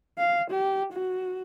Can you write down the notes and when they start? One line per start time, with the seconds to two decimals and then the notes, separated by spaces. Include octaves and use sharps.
0.18 F5
0.51 G4
0.93 F#4